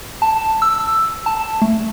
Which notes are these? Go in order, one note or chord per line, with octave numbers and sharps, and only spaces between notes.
A5
E6
A5
A3